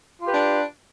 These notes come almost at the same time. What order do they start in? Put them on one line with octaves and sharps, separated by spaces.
F4 G4 B4 D4